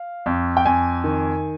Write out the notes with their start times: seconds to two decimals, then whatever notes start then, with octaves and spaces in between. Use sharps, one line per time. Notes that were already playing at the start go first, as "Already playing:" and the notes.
Already playing: F5
0.26 F2
0.57 G5
0.65 F2 G#5
1.04 D#3